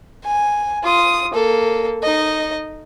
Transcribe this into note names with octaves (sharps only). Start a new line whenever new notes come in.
G#5
F4 D#6
A#3 A4
D#4 D#5